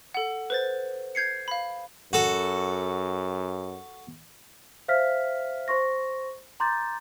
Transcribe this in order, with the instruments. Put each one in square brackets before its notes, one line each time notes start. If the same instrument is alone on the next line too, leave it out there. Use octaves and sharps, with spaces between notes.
[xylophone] A4 F#5
B4 C5 A6
G6 G#6 C7 C#7
F5 B5
[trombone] F#2 [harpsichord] F#4 A4
[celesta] C5 E5 F5 F6 B6
C5 C6 C#6 A#6
A#5 C6 D6 G6 A6